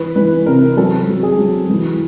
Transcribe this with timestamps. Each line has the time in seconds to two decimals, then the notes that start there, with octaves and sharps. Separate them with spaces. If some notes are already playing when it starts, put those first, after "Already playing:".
Already playing: E3 B4
0.16 E3 B4
0.46 C3 A#4
0.77 F#3 A4
1.08 F#3
1.23 G#4
1.39 F#3
1.70 E3